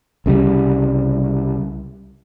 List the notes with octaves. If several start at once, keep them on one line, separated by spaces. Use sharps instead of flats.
C2 C#3 F#3 G3